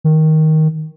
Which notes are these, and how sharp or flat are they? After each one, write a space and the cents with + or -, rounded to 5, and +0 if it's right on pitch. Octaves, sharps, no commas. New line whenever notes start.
D#3 +10